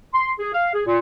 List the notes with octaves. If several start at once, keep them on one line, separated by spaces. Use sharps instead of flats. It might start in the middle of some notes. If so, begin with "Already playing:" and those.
C6
G#4
F5
G#4
A#2